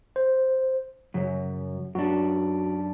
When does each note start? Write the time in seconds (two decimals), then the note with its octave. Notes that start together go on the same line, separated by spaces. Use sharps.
0.16 C5
1.14 F#2 C#3 F#3
1.95 F#2 D4 F#4